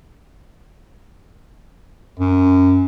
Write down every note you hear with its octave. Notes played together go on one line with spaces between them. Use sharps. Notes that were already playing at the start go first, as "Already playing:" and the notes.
F#2